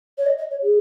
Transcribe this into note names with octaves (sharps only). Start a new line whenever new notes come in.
C#5
D#5
D#5
C#5
G#4